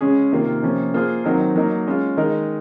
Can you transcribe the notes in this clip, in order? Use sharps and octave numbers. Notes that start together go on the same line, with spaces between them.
C#3 G#3 C#4 G#4
C3 D#3 A#3 F4
C3 F3 A#3 C#4
A#3 F4 G#4 C5
D#3 F#3 C4 D#4 A#4
F#3 A#3 D#4 A#4
G#3 C#4 F4
D#3 G#3 D#4 A#4